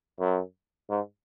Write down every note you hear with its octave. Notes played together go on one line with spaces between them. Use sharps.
F#2
G#2